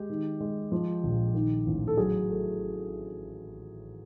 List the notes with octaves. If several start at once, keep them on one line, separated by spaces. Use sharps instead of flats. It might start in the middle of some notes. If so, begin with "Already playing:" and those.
Already playing: G#3 G4
D#3
G#3
F3
A#1
D#3
A1
A4
F#3 G#4
A3